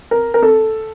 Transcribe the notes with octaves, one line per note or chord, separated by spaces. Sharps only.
A#4
A#4
A4